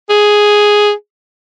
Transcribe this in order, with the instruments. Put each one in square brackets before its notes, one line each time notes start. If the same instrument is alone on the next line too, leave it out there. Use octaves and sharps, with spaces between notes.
[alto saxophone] G#4